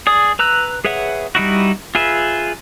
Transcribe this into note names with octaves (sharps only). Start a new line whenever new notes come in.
G#4 D5 D#6
B4 A#5 E6 F#6
G#4 B4 C#5 E5 F#5
G3 D#4 E4 F#4
F4 G#4 B4 E5